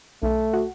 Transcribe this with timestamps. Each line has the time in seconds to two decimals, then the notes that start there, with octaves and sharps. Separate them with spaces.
0.23 B1 A3
0.53 F#4